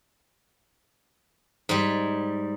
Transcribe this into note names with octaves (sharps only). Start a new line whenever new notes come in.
G#2 G3